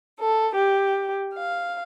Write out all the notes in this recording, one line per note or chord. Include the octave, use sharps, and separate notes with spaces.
A4
G4
F5